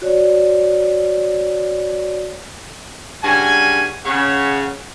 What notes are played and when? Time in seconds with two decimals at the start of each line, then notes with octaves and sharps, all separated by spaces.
0.02 F#4 C#5 D5
3.23 G2 C#3 F#4 G#5
4.05 C#3 C#5 F#5